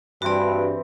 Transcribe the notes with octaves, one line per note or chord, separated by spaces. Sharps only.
G2 E3 C4 F#4 D5